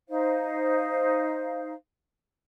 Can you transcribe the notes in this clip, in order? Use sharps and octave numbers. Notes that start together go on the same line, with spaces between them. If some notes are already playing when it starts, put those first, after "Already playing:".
D#4 C5 F5